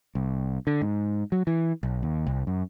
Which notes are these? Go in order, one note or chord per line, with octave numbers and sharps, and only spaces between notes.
C2
D3
G#2
F#3
E3
B1
D#2
C2
F#2